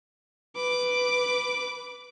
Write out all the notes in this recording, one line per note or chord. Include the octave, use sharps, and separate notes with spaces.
B4 D6